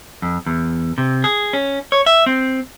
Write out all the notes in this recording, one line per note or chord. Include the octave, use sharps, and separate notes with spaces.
F2
E2
C3
G#4
C#4
C#5
E5
C4